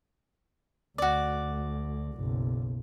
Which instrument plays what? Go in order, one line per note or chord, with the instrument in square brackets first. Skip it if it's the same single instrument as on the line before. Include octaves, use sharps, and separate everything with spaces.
[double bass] D2 [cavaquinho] F#4 D5
[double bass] F#1 B1